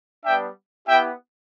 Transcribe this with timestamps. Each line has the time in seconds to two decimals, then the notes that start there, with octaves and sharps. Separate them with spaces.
0.25 G3 B3 D4 E5 G5
0.88 B3 E4 G4 E5 G5